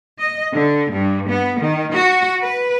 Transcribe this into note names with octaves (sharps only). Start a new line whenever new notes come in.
D#5
D3
G2
B3
D#3
F#4
B4